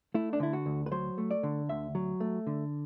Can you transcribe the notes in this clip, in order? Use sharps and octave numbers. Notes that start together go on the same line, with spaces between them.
A3 E4
D4
D3 E4
F#4
D2
B4
F#3 C5
A3
D5
D3
D2 E5
F#3
A3
D3